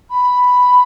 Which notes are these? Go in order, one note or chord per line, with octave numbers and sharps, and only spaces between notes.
B5